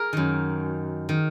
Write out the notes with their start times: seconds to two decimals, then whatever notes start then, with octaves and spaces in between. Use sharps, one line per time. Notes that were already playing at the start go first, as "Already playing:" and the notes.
Already playing: G#4 A#4
0.13 F#2 D#3
1.09 D#3